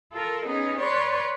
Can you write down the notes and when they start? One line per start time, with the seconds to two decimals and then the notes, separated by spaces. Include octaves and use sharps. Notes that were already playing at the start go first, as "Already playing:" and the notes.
0.12 F4 A4 A#4
0.43 B3 C#4 D#4 G#4
0.79 B4 C#5 D5 C6 C#6